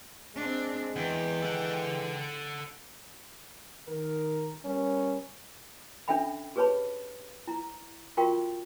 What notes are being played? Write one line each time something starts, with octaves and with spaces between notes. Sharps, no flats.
G#3 C4 D4
E2 E3 G5
A4 F#5
D#3 A#4
G3 B3 C#4 A#4
C#4 D4 A4 E5 G5 B5
G4 G#4 B4 C#5 A5 B5
E4 A#5
F4 F#4 A#4 F5 G5 C#6